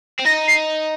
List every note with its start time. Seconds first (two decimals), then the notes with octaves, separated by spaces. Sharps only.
0.19 C4
0.25 D#4 A#6
0.47 C7